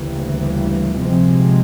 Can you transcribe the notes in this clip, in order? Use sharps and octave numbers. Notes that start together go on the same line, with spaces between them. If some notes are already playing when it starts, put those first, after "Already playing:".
Already playing: D2 C#3 E3 G3 A#3
C3 F3 G#3 C4